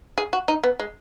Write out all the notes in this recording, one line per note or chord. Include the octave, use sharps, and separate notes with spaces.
G#4
F#4
D#4
B3
G#3